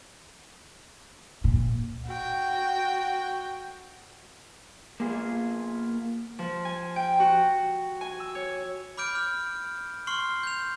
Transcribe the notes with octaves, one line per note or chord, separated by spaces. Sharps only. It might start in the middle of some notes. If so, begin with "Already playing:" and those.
A#2
F#4 G5
A#3 B3 F4 G#4
F3
G#5
G5
F#4
G#5
E6
C#5
B5 D6 F6 G6 D7
F6
C6 C#6 F6 C7
G6 F7